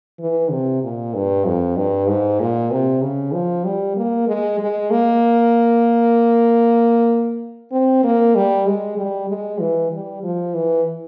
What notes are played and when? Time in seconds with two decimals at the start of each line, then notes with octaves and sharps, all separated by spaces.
0.20 E3
0.51 C3
0.83 A#2
1.14 G2
1.45 F2
1.77 G2
2.08 G#2
2.40 A#2
2.71 C3
3.02 C#3
3.33 F3
3.65 G3
3.97 A#3
4.28 G#3
4.59 G#3
4.91 A#3
7.72 C4
8.04 A#3
8.35 G3
8.66 G#3
8.97 G3
9.29 G#3
9.60 E3
9.92 G3
10.23 F3
10.54 E3